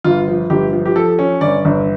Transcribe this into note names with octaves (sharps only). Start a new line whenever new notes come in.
G1 F4
F3
G1 G4
F3
G4
F3 A4
C#4
G1 D5
G1